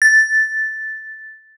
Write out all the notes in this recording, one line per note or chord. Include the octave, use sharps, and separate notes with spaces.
A6